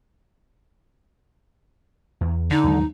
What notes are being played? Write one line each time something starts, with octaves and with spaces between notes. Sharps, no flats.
E2
D3 D#4
D#2 F#3 G#3